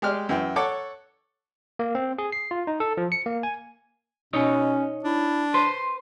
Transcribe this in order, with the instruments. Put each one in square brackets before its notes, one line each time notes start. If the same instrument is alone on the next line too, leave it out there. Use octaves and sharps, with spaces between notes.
[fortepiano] G#3 G4 D5 F6
F#2 E3 G5
A4 C#5 F#5 C#6 D6
[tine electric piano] A#3
C4
G#4
C7
F4
D#4
A4
F3
C#7
A#3
G#5
[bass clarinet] B2 [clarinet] C#4 [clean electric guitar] D#4 C#5 D#5
[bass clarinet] D4 [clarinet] E4
[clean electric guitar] B4 C5 [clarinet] C6